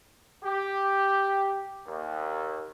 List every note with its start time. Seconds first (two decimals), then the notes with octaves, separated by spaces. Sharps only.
0.44 G4
1.86 D#2